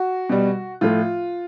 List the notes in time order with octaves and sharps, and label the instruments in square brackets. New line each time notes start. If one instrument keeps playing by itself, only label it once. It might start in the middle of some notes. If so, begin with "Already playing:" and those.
Already playing: [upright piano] F#4
B2 G3
A2 F3 A3 F4